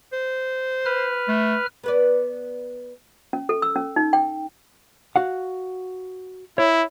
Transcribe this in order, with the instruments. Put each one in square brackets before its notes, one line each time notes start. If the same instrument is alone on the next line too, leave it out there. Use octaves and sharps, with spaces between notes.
[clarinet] C5
[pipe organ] B4 F6
[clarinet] A3
[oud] B3 B4 D5
[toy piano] C#4
A4
E6
C#4
D#4
G5
[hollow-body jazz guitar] F#4 F5 F#5
[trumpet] E4 [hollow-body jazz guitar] C#5